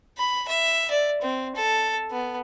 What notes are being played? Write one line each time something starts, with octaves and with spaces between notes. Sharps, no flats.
B5
E5
D5
C4
A4
B3